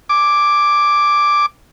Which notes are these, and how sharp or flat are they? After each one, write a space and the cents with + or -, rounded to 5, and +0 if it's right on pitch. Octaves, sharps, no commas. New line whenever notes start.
G#5 +0 D6 +0